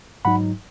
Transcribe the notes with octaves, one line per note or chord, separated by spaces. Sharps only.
G#2 F#3 D#4 F#5 B5